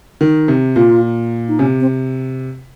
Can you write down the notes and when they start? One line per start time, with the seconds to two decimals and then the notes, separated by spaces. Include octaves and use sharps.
0.21 D#3
0.48 C3
0.75 A#2 F4
1.48 D#4
1.59 C3 C#4
1.80 C4